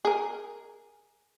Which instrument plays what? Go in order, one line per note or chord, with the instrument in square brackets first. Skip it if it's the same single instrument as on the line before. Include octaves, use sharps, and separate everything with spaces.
[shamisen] G#4 A#4